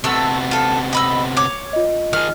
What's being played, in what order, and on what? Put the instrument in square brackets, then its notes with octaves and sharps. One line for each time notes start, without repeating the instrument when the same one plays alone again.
[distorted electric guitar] C3 B3 [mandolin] A3 E6
[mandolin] F4 A4
D#5 B5 E6
C#5 D6
[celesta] F4 D#5
[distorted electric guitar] D#3 G#4 [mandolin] F6